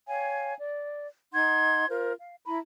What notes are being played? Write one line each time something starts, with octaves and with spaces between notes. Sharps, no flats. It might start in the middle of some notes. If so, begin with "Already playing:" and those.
C#5 F5 G5 G#5
D5
D#4 F#5 C6 G#6
F4 A#4 C5
F5
E4 A#5 B5